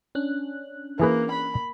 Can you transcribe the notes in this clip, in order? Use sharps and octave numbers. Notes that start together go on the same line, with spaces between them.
C#4 D4 F#6
E3 A#3 G#4 B4
B5